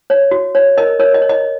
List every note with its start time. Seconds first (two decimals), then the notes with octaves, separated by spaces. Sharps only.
0.10 C#5
0.31 F#4
0.55 C#5
0.78 A#4 D#5
0.99 A#4 C#5
1.14 D#5
1.22 C#5
1.29 D#5